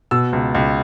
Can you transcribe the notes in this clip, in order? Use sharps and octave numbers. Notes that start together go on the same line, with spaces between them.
B2 E6
C#2
C#2